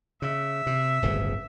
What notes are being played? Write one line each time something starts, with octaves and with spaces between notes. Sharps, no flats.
C#3 E5
C3
D1 G1 C#3